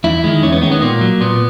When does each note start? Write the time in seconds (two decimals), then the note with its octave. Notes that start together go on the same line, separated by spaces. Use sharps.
0.04 E2 E4
0.24 D#3 G#3
0.43 E2 C#4
0.52 B3
0.61 D#3 G#3 C#4
0.71 B3
0.81 A#2 A#3
1.01 F#3
1.21 A#2 B3